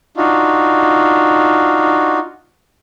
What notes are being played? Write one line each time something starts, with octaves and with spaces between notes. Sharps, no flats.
D4 D#4 F4 F#4